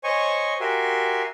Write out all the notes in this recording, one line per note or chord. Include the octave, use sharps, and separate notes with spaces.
C5 C#5 D#5 G#5 C#6
F#4 G4 A#4 E5 G#5 C6